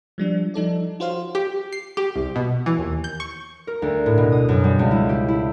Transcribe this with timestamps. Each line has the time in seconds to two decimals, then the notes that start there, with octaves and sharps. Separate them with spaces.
0.18 F3 G3 D4
0.54 F3 D#4 A4 D5
1.00 F4 F#4 C5 C#5 F5
1.35 G4
1.72 C7
1.97 G4
2.16 C2
2.36 B2
2.66 E3
2.78 D#2
3.04 G6
3.20 C#6
3.67 A#4
3.82 D2
4.06 A2
4.18 B2
4.32 D#6
4.49 F#2
4.64 G3
4.79 C#2
4.91 E4
5.09 G4
5.28 E4